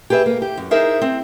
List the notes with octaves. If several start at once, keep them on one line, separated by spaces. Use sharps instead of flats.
G4 G#4 B4 D#5 E5
A#3
G4
F#2
D#4 G#4 A#4 C5 E5
C4